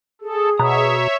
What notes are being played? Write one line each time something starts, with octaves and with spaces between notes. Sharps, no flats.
G#4 A4
B2 C#5 E5 A#5